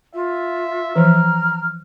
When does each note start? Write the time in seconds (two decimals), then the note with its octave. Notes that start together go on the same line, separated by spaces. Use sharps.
0.14 F4 E5
0.96 E3 F3 A#5 F6